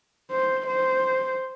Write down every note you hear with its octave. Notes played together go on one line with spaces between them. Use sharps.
C5
C5